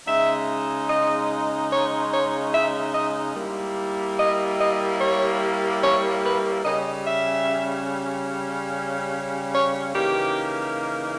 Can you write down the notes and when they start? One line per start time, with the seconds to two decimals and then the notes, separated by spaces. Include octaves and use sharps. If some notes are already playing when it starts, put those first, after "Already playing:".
0.07 C#3 G#3 D#4 E5
0.88 D#5
1.71 C#5
2.13 C#5
2.53 E5
2.94 D#5
3.35 G3 A#3 E4
4.17 D#5
4.59 D#5
5.00 C#5
5.83 C#5
6.23 B4
6.64 C#3 G3 C#4 D#5
7.06 E5
9.52 C#5
9.93 C#3 E3 A#3 D#4 G4